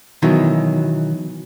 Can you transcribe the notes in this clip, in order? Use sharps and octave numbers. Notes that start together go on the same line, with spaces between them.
B2 D#3 E3 F#3